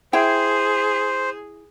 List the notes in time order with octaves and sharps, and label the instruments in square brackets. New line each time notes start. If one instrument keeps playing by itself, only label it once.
[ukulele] E4 G5 [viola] G#4 [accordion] C5